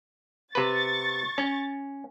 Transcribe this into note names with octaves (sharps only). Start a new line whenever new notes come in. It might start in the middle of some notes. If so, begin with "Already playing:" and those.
C3 B4 C#6 A6
C#4